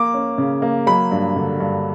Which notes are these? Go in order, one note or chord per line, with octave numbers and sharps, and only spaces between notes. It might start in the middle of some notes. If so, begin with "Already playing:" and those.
Already playing: A#3 D6
C#4
C#3
A#3
F#3 B5
G2
D3
G2